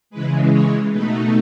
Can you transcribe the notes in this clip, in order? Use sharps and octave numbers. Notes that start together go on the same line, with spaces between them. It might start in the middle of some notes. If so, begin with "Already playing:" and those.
C#3 E3 G#3 B4
C#5
B2 A3 D#4 B4